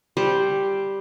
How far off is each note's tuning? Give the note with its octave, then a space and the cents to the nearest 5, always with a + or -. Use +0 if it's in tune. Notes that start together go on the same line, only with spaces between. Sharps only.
G3 +0 C5 +0